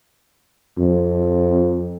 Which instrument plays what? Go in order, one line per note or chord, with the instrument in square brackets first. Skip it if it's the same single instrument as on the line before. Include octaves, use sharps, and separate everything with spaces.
[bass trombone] F2